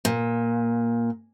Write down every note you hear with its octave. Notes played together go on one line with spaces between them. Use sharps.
A#2